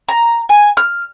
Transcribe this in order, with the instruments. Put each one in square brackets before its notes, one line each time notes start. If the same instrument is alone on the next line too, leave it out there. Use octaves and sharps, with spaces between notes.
[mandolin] A#5
G#5
F6